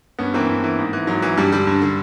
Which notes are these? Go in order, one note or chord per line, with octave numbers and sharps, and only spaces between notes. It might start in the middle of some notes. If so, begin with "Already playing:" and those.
G2 B3 C#4
E3 A#3 C4
G2
E3
G#2
E3
G#2 F#3
E3
G2 G3
D3 G3
G2
D3